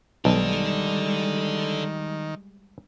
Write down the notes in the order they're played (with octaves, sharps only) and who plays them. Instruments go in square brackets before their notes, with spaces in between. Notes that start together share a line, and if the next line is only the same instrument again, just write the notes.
[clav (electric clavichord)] B1 [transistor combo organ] D#3 [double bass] G3 G#3 [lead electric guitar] A4 D5